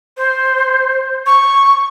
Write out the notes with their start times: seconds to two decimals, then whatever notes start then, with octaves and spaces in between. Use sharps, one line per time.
0.17 C5
1.26 C#6